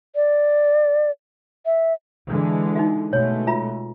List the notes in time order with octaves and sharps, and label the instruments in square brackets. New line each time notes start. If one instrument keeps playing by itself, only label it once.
[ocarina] D5
E5
[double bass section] D3 E3 G#3
[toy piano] D#4 F#4 E5
[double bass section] B2 G#3 A3 [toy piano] C#5
[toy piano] F4 E5 A#5